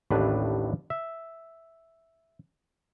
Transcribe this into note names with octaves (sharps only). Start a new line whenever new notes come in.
A1 D#2 A2 D4 B4
E5